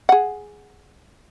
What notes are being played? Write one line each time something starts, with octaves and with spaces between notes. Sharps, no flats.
G#4 F#5